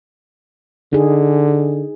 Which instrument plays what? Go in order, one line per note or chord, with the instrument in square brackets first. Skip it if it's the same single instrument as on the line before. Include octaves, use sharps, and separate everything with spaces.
[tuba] D3 [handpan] D#4 G#4